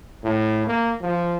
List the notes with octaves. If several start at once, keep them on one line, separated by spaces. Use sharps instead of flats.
A2
A#3
F3